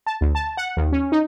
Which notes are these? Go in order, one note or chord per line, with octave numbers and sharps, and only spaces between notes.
A5
D2
A5
F#5
D#2
C#4
D#4